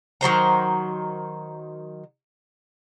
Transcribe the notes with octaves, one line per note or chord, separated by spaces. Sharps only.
D#3 F#3 C5 A#5